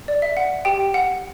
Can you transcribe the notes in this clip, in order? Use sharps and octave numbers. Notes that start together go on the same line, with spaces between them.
D5
E5
F#5
G4 G5
F#5